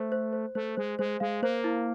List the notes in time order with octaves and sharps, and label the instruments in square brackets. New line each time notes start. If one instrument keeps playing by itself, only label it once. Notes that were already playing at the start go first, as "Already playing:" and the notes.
Already playing: [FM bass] A3 [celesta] C5
[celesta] C5
C5
[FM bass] A3 [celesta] C5
[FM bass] G#3 [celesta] C5
[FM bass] G#3 [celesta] C5
[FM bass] G#3 [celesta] F5
[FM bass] A#3 [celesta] C5
[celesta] E4